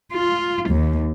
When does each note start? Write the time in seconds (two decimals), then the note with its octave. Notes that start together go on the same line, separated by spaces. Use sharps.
0.15 F4
0.71 D#2